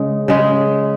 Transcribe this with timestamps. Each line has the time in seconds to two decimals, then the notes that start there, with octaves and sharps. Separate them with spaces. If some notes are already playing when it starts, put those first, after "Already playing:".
Already playing: C#3 G#3
0.28 C#3 G#3